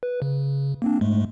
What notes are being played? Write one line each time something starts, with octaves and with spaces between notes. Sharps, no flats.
B4
C#3
A#3 C4 D4
G#2 G#3 A3